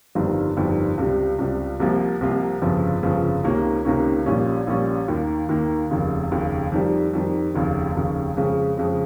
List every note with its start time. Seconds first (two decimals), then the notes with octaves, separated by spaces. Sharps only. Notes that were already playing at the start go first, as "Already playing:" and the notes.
0.15 G1 F2 D#3 G3
0.57 G1 F2 D#3 G3
0.98 C#2 C3 G3
1.38 C#2 C3 G3
1.80 C2 C3 F3 A#3 F4
2.21 C2 C3 F3 A#3 F4
2.62 G1 F2 C#3 F3
3.03 G1 F2 C#3 F3
3.44 C#2 C3 D#3 A#3 C#4
3.85 C#2 C3 D#3 A#3 C#4
4.26 A#1 A#2 G3 C#4
4.67 A#1 A#2 G3 C#4
5.08 D#2 D#3 A#3
5.49 D#2 D#3 A#3
5.90 F1 D#2 C#3
6.32 F1 D#2 C#3
6.72 F2 D#3 G3
7.13 F2 D#3 G3
7.54 F1 D#2 C#3
7.95 F1 D#2 C#3
8.37 F2 C#3 G#3
8.77 F2 C#3 G#3